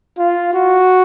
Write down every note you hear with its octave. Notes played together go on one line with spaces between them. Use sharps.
F4
F#4